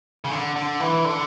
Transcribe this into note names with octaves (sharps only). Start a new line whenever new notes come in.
C#3
D3
D3
E3
D3